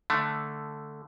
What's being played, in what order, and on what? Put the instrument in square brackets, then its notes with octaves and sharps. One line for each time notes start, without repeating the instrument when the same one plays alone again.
[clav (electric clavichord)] D3 A3